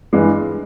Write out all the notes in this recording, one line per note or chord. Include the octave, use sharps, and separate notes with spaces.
G2 E3 G#3